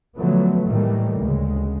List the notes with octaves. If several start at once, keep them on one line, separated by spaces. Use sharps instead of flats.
D3 F3 F#3 A3 B3
A2 D#3 E3 G3 A3 A#3
D2 C#3 G#3